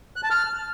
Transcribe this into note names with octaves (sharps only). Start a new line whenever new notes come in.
F#6
A5
F6